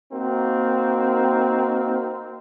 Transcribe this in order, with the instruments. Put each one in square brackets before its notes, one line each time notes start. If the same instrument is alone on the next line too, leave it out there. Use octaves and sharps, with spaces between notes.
[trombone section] A#3 C4 D#4 F#4 A#4